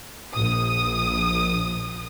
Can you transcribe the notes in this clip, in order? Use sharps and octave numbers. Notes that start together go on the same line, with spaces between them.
A#1 D#6